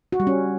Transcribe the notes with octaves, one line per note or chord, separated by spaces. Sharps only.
F#4
G3
C#4